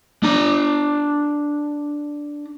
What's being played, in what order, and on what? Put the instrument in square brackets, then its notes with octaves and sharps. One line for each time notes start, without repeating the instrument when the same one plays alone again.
[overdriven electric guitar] D4 A#5